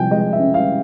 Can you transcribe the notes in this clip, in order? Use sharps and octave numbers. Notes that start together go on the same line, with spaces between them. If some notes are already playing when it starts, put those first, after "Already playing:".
Already playing: C3 F3 G5 G#5
G#3 D#5
E5
C#4
F5